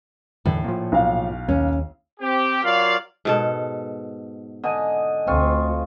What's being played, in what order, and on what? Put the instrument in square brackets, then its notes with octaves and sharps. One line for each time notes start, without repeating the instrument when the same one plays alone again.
[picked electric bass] E2 D3 E3 [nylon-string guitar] A2
[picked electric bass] A#2 F3
[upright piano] B1 F5
[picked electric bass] D#2 [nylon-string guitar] C#4
[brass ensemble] C4 G4
F#3 F4 A#4 D5 F5
[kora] G#2 B2 A4
[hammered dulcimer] D3 D#5 G#5
[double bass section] D2 [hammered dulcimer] C4 F4 C#6